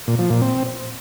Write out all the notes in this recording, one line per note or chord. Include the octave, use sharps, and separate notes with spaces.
A#2
F3
A#2
C4